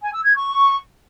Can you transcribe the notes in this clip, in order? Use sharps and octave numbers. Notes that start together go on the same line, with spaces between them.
G#5
E6
G#6
C#6